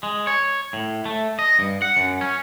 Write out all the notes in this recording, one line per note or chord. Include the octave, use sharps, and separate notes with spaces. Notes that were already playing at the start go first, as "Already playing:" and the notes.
G#3
C#5
A2
A3
D#5
G2
F#5
F#2
C#4